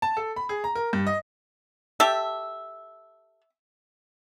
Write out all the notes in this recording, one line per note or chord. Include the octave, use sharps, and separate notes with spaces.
A5
A4
B5
G#4
A#5
A#4
G2
D#5
G4 A4 E5